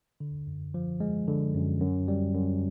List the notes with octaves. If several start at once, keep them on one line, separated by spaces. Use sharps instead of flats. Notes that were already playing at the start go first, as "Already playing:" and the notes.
D3
F#2
F3
G#3
D3
F#2
F#2
G3
F#2